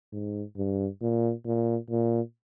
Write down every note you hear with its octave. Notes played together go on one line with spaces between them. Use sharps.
G#2
G2
A#2
A#2
A#2